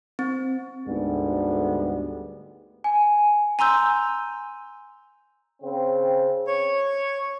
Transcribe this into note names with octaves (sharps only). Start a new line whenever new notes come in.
C4
D2 G#2 D3 G3 B3
G#5
G#5 A#5 C6 E6 G6
C#3 C4
C#5